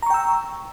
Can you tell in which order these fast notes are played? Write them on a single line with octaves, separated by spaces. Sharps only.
A#5 C#6 G5 E6